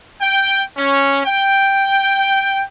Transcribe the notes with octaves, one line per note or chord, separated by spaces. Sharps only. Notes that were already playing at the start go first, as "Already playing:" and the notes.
G5
C#4
G5